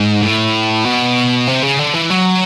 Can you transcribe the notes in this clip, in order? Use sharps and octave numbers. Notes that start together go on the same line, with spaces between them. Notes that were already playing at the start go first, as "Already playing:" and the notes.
Already playing: G#2
A2
B2
C3
C#3
D3
E3
F#3